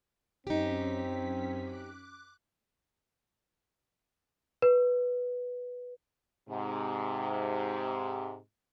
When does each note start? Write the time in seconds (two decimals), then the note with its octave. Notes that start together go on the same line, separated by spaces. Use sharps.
0.47 F#2 C4 C#4 D#4 G4 B6
1.64 D6 F#6
4.62 B4
6.49 G#2 C3